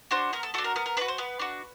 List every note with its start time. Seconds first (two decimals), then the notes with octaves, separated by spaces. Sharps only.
0.11 D4 F#4 C5
0.33 B3 A#4
0.43 A4
0.54 D4 F#4 A4
0.64 A#4
0.76 B3 A#4
0.86 A#4
0.97 D4 B4
1.01 F#4
1.08 C5
1.18 B3 B4
1.39 D4 F#4